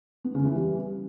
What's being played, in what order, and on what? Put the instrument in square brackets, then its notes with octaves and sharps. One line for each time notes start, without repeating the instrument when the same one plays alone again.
[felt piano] B3
C#3
E3
G3